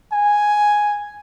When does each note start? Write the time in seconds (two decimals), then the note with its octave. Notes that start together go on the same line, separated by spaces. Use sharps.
0.12 G#5